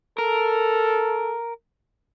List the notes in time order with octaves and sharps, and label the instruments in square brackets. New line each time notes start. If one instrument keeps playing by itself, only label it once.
[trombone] A4 [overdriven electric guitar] A#4